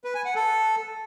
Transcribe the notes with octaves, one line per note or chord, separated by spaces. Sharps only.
B4
G#5
F#5
A4